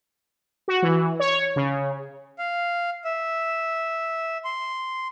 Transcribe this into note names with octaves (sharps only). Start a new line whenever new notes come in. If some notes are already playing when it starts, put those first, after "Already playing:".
F#4
E3
C#5
C#3
F5
E5
C6